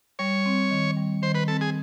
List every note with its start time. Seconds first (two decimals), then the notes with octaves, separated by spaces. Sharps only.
0.19 G3 C#5
0.46 C4
0.71 D#3
0.97 G3
1.22 D#3 C5
1.35 B4
1.48 C4 A4
1.61 G#4